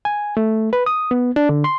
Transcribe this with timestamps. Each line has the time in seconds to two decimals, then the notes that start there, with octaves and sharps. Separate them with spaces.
0.05 G#5
0.37 A3
0.73 B4
0.86 D#6
1.11 B3
1.36 D4
1.49 D3
1.64 C6